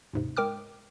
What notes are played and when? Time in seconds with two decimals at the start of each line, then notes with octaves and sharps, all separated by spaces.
0.13 D#2 G#2 C3
0.37 G#3 A#4 G5 D6 F6